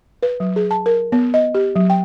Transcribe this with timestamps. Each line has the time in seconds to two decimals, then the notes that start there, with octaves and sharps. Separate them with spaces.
0.23 B4
0.40 F#3
0.56 G#4
0.71 A5
0.86 A#4
1.12 B3
1.34 D#5
1.55 G4
1.76 F#3
1.90 G5